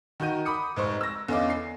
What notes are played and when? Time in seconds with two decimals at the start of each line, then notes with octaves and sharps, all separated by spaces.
0.20 D#3 F#4 A#4 G6 D#7
0.45 B5 D6 D#6 C#7
0.76 F1 G#2 C5 C#6
1.01 E6 A#6
1.28 E2 D3 C#4 D#5 F5 D6
1.50 C7